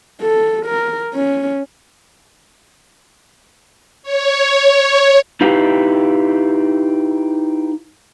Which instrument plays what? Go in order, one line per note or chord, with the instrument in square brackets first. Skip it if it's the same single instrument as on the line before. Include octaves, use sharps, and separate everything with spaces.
[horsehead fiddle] A4
A#4
C#4
[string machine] C#5
[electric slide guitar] D#4 E4 G4 B4 F5